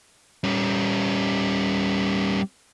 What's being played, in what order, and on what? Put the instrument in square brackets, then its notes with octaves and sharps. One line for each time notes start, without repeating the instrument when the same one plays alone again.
[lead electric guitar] G3 C#4